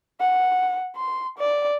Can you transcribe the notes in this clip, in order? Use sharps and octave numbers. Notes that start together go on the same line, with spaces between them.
F#5
C6
D5